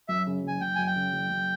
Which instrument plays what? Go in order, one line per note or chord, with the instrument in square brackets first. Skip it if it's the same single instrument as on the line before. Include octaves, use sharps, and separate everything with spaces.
[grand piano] F#2 [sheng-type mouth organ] E5
[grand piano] C#3
[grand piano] F#1 [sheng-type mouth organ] G#5
[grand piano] F#1 [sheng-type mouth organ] G5
[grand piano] F#2 [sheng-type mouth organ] G#5
[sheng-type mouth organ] G5
[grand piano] C#3
F#1
F#1